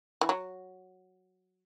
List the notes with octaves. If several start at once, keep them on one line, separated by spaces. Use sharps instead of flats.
E3
F#3